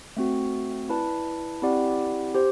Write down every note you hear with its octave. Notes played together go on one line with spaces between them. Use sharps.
A3 C4 F#4
E4 B4 D5 A5
C4 E4 G4 D5 F#5
G4 C5